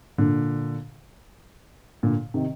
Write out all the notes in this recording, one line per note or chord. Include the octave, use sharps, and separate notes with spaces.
A#2 D3
A#2 D3
C3 D#3